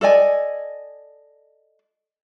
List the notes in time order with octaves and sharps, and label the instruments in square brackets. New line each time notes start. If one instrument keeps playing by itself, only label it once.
[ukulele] A4 D5 D#5 G#5